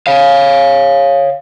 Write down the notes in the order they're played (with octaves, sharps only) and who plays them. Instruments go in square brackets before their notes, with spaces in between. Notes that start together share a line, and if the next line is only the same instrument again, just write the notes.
[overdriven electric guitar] C#5 F5